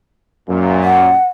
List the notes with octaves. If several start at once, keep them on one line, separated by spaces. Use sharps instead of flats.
F#2 A#2
F#5